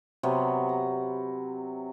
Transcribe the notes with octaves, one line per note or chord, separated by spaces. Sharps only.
C3 F#3 B3
A#5